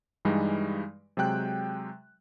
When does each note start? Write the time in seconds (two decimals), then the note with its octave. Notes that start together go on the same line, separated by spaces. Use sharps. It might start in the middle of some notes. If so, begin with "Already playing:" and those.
0.25 G2 E3 G3 G#3 D#4
1.17 C3 F#3 G#3 G5 F#6